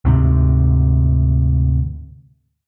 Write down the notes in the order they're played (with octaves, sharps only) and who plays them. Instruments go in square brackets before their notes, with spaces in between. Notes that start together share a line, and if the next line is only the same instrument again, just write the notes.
[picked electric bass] D2 G#2 C3